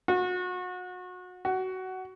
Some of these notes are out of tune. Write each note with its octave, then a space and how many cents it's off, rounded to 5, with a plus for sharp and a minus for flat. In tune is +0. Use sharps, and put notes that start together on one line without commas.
F#4 -30
F#4 +15